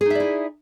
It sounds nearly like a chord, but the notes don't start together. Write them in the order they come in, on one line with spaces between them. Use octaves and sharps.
G#4 D#4 E5 D5 E4